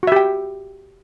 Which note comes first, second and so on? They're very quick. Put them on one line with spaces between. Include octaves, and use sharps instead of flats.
F#4 E5 G4 G5